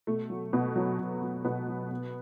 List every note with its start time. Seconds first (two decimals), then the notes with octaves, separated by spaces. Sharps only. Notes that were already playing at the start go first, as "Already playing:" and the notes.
0.07 B2 A3
0.30 F#3
0.53 B2 B3
0.76 F#3
0.99 B2
1.22 F#3
1.45 B2 B3
1.68 F#3
1.91 B2